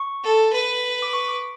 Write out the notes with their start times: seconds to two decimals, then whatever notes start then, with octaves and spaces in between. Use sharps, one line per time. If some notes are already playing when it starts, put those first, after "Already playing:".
Already playing: C#6
0.24 A4
0.53 B4
1.02 D6
1.13 C#6
1.28 D6